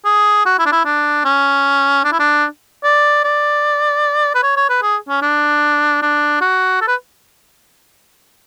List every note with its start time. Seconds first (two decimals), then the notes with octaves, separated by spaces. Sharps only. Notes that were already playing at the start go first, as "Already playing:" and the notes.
0.05 G#4
0.46 F#4
0.59 E4
0.66 D4
0.72 E4
0.85 D4
1.25 C#4
2.04 D4
2.12 E4
2.19 D4
2.84 D5
3.24 D5
4.35 B4
4.43 C#5
4.57 C#5
4.70 B4
4.82 G#4
5.09 C#4
5.22 D4
6.02 D4
6.41 F#4
6.82 A4
6.88 B4